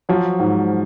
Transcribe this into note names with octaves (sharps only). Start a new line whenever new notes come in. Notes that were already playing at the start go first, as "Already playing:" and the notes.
F3 F#3
G#2